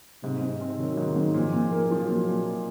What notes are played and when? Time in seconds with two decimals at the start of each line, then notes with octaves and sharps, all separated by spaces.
0.23 G#2 C3
0.41 G#2
0.61 C4
0.78 D#3 F#3
0.97 G#2
1.16 G#2
1.34 A#2 F3
1.53 A#2
1.72 A#3
1.90 F3 F#3
2.09 A#2
2.27 A#2